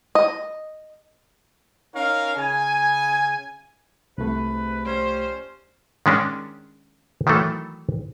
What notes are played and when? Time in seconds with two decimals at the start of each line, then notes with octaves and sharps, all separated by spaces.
0.15 D#5
1.94 C#4 D#4 A#4 C#5 F5
2.36 C#3 G#5
4.18 C2 G#2 C3 A3 B4
4.86 F3 G3 C#4 C5
6.06 D#3 G#3 C#4 D4
7.27 D#3 E3 F#3 A3 A4